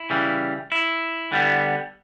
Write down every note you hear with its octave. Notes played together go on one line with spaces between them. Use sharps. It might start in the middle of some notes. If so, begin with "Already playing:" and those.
Already playing: E4
C#3 E3 G3
E4
D3 G3 B3